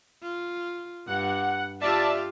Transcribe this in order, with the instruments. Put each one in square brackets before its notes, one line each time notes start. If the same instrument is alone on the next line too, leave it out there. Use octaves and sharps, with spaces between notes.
[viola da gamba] F4
[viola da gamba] G2 [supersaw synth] F#5
[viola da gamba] F4 G4 [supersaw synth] D5 E5 A5